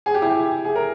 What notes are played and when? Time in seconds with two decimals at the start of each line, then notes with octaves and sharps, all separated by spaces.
0.06 G#4
0.14 G4
0.22 E4
0.30 G4
0.65 G#4
0.75 A#4